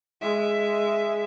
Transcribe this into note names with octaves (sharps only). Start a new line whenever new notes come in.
G#3 E5